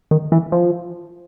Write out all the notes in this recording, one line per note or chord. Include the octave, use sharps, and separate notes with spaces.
D#3
E3
F3